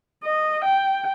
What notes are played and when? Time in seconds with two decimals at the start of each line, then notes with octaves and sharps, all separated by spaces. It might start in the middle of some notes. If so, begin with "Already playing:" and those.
0.24 D#5
0.65 G5